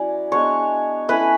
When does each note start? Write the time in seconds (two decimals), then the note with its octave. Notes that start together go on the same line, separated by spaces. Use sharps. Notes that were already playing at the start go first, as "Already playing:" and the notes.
Already playing: F#3 C#4 E4 D5
0.32 G#3 B3 D4 C#5 C#6
1.08 A3 C#4 E4 B4 B5